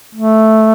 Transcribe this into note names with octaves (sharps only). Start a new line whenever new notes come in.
A3